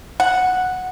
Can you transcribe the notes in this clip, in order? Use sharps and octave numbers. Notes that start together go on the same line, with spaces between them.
F#5